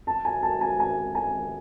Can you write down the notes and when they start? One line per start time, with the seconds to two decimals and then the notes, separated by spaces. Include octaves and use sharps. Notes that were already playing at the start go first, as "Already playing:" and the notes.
0.07 A5
0.25 G#5
0.43 A5
0.61 G#5
0.80 G#5
1.15 G#5